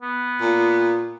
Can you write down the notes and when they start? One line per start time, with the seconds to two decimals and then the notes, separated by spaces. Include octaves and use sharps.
0.02 B3
0.41 A#2